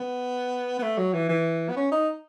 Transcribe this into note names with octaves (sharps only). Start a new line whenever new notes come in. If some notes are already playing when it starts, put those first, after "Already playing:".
Already playing: B3
B3
A3
F#3
E3
E3
B3
C#4
D#4